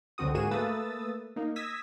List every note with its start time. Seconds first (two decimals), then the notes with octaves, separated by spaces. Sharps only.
0.18 C#2 D3 C4 F#4 D#6
0.34 G#2 A#3 F#4 G#4 D#7 E7
0.51 A3 A#3 B4 D#6 E6 A6
1.36 A#3 D#4
1.56 D#6 E6 G#6 A#6 B6